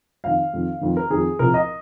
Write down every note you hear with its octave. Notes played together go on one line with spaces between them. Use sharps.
F2 D#3 F5
F2 D#3
F2 D#3
A#4
F2 D#3 G#4
C2 A#2 F3 A#4
D#5